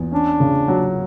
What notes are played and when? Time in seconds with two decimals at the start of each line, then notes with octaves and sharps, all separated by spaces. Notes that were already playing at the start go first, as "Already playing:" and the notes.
Already playing: E2
0.12 C#4 D4
0.40 C#3
0.68 F#3